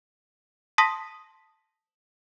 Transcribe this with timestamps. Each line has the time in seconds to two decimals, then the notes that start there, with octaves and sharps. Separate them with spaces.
0.78 A5 C6 D#6 A#6 B6